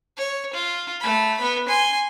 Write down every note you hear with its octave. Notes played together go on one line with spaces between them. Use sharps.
C#5
F4
A3 B5
B3 B5
G#5 C6